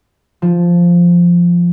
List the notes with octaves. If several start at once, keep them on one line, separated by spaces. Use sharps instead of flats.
F3